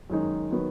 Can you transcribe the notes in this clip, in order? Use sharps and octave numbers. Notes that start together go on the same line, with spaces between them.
F#2 D#3 G#3 D#4
D#3 F#3 B3